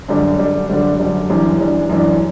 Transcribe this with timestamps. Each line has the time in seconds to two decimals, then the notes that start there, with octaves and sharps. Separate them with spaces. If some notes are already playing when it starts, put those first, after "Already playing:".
0.08 F#2 D3 G3 D4
0.39 F#2 D3 G3 D4
0.69 F#2 D3 G3 D4
0.99 F#2 D3 G3 D4
1.30 F#2 E3 G3 D4
1.59 F#2 E3 G3 D4
1.89 F#2 E3 G3 D4